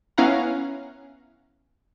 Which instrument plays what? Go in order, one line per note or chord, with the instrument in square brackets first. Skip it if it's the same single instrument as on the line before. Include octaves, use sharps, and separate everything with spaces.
[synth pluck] B3 C#4 E4 F5 F#5 A#5